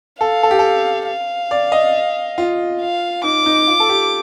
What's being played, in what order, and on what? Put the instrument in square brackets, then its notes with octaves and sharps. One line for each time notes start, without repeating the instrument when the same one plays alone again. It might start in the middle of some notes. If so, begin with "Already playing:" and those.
[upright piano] A4 [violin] F5
[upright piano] A4
G4
A4
[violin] F5
[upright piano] D5
D#5
F4
[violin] F5
[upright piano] D#4 [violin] D6
[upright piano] D#4
F4
A4
G4